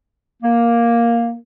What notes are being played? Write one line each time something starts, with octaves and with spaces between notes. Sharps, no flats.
A#3